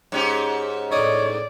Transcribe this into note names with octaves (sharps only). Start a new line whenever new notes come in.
G#2 C#4 G4
A2 D#4 C#5 D5